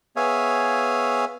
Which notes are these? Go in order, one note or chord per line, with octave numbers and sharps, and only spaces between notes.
B3 G#4 C#5 E5 F5 G#5